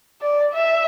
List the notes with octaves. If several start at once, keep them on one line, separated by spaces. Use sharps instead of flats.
D5
E5